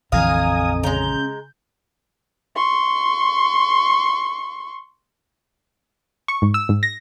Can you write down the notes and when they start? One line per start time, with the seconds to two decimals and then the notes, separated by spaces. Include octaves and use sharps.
0.12 A#1 F2 D3 E3 F5 G#5 A#5 D#6
0.83 C#3 G#3 A#5 G6
2.56 C6 C#6
6.28 C#6
6.42 G#2
6.54 E6
6.69 G#2
6.83 A#6